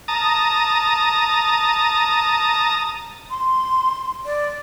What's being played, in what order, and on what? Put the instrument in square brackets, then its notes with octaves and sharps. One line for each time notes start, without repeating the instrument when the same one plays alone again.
[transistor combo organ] A5 A#5 D#6
[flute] C6
D5